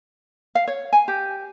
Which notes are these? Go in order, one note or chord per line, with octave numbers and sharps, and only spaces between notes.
F5
C#5
G#5
G4